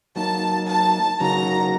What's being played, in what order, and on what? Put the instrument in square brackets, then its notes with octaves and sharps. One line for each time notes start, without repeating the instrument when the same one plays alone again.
[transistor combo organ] F#3 A#3 D#4 [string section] A5
[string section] A5
[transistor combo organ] C#3 F#3 A#3 D#4 F#4 [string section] A#5